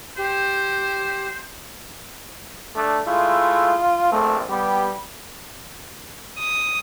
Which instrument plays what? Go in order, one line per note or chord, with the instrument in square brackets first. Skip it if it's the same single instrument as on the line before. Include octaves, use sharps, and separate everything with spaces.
[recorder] G4 [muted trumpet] C5
[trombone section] A3 D4
[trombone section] G#3 A3 E4 [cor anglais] F4
[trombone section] A#1 G#2 C4 [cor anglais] A3
[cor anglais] G3 [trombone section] B3 G4
[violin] D#6